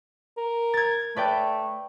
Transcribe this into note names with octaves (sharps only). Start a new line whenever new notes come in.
A#4
G#6 A6
A3 B4 D5 G5